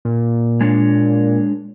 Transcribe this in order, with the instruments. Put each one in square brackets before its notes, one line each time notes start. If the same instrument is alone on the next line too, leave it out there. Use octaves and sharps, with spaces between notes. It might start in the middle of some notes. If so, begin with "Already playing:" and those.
[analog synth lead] A#2
[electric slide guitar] G#3 D4 C#5